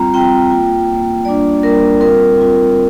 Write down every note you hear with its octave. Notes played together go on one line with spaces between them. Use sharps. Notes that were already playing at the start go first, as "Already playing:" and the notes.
Already playing: G3 C4 F4 A#5
G3 C4 F4 G5
A#3 F4
A#3 F4
G3 A#3 D4 F4 D5
G3 A#3 D4 F4 A#4
G3 C4 F4 A#4
G3 C4 F4